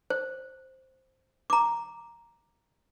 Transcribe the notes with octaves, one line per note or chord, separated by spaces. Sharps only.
C5
A#5 D6